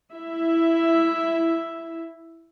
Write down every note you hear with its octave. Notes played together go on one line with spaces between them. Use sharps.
E4 E5